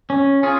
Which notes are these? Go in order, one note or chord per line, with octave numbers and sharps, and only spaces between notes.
C#4
C#4 F4 G#4